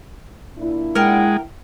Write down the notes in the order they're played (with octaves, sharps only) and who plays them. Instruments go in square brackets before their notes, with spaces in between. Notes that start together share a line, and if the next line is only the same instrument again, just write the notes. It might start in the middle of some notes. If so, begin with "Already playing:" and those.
[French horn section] A#2 D4 E4
[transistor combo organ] G#3 [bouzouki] A#4 F#5 G5